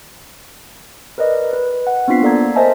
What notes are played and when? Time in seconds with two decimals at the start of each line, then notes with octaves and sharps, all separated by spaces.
1.18 A#4 B4 D5 D#5
1.53 B4
1.87 F#5
2.08 B3 C4 D4 F4 B6 C7
2.22 A#3 A4 D5 A#5 G#6
2.56 A#4 C5 D#5 E5 G#5 A5